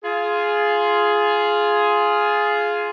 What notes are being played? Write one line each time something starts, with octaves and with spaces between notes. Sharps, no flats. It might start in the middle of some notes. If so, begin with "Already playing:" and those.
F4 G#4